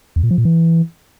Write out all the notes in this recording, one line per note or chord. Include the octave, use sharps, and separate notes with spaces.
E2
A#2
F3
A#2
E3